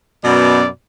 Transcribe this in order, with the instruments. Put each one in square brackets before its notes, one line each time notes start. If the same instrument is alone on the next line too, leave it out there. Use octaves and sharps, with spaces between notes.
[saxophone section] F#2 B2 [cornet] D5